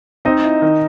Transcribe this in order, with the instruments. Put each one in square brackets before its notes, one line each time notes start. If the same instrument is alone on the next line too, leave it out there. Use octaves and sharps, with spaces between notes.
[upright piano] C4 [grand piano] D#4 D#5
[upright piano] E4
D#3